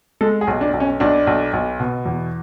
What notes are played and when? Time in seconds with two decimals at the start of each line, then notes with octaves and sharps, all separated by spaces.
0.21 G#3 A4
0.41 G#4
0.47 B1
0.61 D4
0.73 B1
0.80 C#4
1.00 B1 D4
1.27 B1
1.53 B1
1.80 B2
2.06 E2